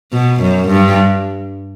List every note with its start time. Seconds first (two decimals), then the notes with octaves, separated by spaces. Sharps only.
0.12 B2
0.41 F#2
0.68 G2